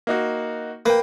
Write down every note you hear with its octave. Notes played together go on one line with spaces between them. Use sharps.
A#3 D#4 F#4
A#3 B4 G5